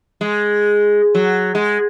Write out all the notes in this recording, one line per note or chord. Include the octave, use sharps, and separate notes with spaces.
G#3
F#3
G#3